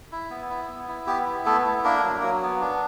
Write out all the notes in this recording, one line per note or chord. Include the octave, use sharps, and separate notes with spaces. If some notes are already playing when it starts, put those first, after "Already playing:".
E4
B3
E4
B3
E4
B3 G4
E4
A3 B3 A4
E4
A#3 D4 A#4
F#3
F#3
B3
D4